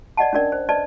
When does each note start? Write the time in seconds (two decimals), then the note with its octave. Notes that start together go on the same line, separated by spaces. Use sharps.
0.17 D5 D#5 F#5 A5
0.33 C#4 D4 A#4 D5
0.52 C5
0.69 B4 D5 D#5 A5